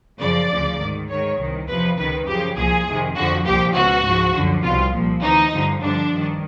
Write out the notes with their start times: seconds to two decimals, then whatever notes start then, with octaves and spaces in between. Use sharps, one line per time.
0.20 F#2 C#3 F3 D5
0.50 D2 C#3 F3
0.79 G#2 D#3
1.09 G#2 D#3 C#5
1.38 C2 C3 D#3
1.67 E2 C3 F3 B4
1.97 C#2 C3 D#3 B4
2.26 F#2 C#3 F3 G4
2.56 C2 A#2 F3 G#4
2.86 F2 C3 D#3
3.15 F2 D3 F3 F#4
3.45 C2 A#2 F3 G4
3.74 C#2 B2 F#4
4.04 G#2 F3
4.33 F#2 D3 F3
4.62 C2 B2 F4
4.92 C2 A#2 F3
5.21 D2 C3 E3 D#4
5.51 G2 D3 F3
5.80 G2 D3 F3 D4
6.10 G2 D#3